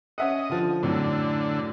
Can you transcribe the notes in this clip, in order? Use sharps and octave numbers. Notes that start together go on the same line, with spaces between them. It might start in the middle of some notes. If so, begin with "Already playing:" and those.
C#4 D#5 E5 F#5
D3 F3
F#2 A2 D3